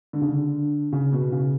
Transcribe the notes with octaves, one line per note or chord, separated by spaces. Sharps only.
D3
C#3
D3
C#3
B2
C#3